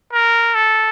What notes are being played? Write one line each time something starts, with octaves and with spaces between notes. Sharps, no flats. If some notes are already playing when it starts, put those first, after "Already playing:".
A#4
A4